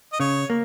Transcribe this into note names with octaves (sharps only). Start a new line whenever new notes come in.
D#5
C#3 C#5
A#3